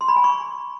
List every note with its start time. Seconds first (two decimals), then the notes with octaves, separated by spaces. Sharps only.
0.01 C6
0.08 B5
0.16 G#5
0.24 C#6